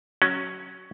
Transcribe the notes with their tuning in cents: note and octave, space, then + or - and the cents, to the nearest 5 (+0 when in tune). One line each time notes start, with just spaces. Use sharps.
F#3 +0 C#4 +0 F#4 +20